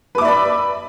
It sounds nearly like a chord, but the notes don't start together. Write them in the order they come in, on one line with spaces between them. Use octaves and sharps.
B4 D6 E5 D5 B5